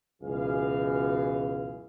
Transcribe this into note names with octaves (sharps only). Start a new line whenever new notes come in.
C#2 F#2 B2 E3 G#4 F5